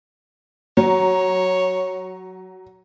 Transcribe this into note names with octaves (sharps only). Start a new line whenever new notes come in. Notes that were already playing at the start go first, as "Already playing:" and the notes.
F#3 C#5